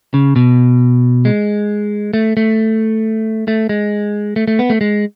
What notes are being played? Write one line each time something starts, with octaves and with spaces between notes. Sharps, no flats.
C#3
B2
G#3
A3
A3
A3
G#3
A3
A3
B3
A3
G#3